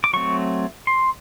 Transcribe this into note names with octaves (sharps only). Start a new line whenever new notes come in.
D6
F#3 A3 C4 C#6
C6